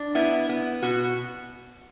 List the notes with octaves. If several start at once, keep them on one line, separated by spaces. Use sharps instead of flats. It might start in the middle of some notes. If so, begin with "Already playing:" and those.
Already playing: D4
B3 E4
B3
B2 F#4